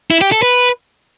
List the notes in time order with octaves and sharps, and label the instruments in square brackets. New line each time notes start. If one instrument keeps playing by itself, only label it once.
[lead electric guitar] E4
G4
A4
B4